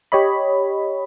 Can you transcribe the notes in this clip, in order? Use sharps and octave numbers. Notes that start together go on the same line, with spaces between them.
G4 C#5 D#5 B5